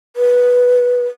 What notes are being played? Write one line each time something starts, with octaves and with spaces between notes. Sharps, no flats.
B4